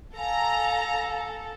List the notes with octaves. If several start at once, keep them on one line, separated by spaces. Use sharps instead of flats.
A4 F5 G#5 A#5